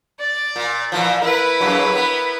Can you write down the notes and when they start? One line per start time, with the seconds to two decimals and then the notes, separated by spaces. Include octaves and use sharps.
0.19 D5
0.56 A#2
0.92 A#2 E3 F3
1.22 E4 A#4 B4
1.60 F#2 C#3 F#3
1.95 B3